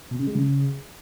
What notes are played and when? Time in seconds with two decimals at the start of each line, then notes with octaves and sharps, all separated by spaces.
0.11 B2
0.19 C#3
0.27 G#3
0.35 C#3